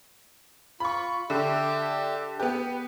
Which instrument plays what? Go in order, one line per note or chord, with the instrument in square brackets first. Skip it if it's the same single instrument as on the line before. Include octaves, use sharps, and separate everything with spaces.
[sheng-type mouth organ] F4 [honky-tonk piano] B5 C#6
[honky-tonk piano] D3 [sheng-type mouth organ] G4 E5
[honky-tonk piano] B3 G4 [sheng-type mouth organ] B4